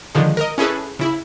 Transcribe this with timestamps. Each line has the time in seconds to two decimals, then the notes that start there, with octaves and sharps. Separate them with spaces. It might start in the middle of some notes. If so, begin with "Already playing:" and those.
0.15 D3 D#3 F3 G#3
0.37 A#4 D#5
0.58 C#4 E4 G#4 A4 B4
0.99 C#3 E4